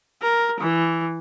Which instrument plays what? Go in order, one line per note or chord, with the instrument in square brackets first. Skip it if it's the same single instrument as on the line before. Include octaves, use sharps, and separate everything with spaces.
[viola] A#4
E3